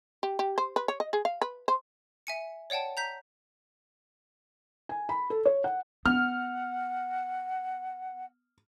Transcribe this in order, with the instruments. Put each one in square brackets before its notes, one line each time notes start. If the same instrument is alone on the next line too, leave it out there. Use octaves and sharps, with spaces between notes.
[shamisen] G4
G4
C5
B4
C#5
D#5
G#4
F5
B4
C5
[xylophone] E5 G#5 C#7
C#5 D5 F#5 G5 A5
A#5 G6 B6
[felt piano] G#5
B5
A4
C#5
F#5
[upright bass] B3 [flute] F#5 [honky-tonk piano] F6